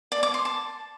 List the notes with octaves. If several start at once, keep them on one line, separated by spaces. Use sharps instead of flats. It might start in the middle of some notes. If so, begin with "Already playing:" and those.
D5
D6
C6
A5